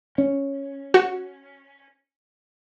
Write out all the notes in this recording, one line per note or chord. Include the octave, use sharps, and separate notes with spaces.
C#4
F#4